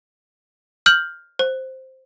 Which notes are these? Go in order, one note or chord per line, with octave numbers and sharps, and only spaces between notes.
F6 G6 F#7
C5